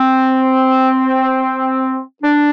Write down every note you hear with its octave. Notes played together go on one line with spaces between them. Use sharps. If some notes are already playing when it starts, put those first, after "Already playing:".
Already playing: C4
D4